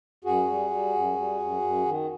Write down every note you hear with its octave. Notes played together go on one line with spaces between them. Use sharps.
F#2 F#4 G#4
G3
G3
F#2
G3
F#2
F#2
D#3